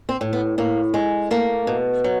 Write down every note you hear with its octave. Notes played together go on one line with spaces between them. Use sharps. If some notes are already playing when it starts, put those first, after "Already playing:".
C4
A2
B3
A2 A#3
G#3
A3 A#3
B2
F#3